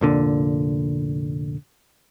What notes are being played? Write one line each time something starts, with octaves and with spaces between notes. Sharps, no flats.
F1 A#2 D3